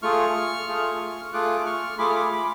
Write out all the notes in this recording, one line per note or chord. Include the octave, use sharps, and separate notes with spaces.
A3 F4 G#4 C#6 F6
A3 F4 G#4
A3 F4 G#4 D6 F#6
C#6 F6
A3 F4 G#4 B5 D6
F6
B5 D6
B5 D6